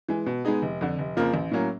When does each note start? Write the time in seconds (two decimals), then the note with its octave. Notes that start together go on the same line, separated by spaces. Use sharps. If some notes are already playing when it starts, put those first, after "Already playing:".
0.08 E3 G#3
0.26 B2
0.45 G#3 B3 D#4 G#4
0.62 F1
0.81 F2 D3
0.99 F1
1.17 F2 C#3 F3 A#3
1.34 A1
1.51 A2 F#3 A#3 C#4